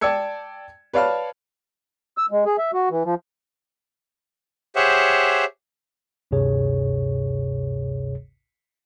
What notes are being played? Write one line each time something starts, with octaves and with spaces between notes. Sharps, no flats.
D5 G5 A5 E6 G#6 C#7
B4 C#5 D5 F5 A5 F6
E6
G#3
G#4
E5
F#4
E3
F3
G4 G#4 C5 C#5 E5 F#5
G#1 D2 G2 C3 G#4 C#5